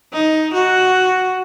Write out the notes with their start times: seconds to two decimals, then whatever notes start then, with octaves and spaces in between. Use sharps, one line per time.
0.13 D#4
0.54 F#4